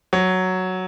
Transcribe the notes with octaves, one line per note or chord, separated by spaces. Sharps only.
F#3